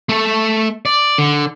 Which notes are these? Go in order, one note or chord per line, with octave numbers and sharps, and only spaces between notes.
A3 A4
D5
D3